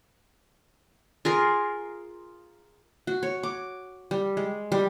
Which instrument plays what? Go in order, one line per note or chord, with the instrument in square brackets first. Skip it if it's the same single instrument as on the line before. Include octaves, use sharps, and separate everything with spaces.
[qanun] F4 G#4 A#4
F#4
C#5
D6
G3
G#3
G3